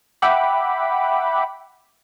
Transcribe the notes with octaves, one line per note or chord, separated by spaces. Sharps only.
E5 F#5 G5 B5 D6